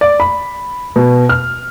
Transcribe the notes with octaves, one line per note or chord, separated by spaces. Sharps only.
D5
B5
B2
F6